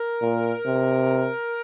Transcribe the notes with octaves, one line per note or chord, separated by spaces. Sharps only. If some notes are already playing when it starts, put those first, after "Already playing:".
Already playing: A#4
A#2
C3